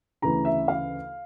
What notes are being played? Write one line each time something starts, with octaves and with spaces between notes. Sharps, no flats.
D2 C#3 E3 A#5
E5
F5